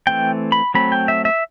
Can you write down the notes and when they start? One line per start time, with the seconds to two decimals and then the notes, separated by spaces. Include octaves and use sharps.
0.07 E3 A3 C4 G5
0.52 B5
0.74 F#3 A3 C4 B5
0.92 G5
1.08 E5
1.25 E5